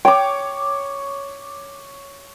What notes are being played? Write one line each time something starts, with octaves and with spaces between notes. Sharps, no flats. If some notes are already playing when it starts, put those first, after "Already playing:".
C#5 G5 D6